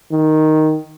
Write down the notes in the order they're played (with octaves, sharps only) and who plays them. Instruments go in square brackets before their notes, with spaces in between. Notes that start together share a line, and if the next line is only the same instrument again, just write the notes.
[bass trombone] D#3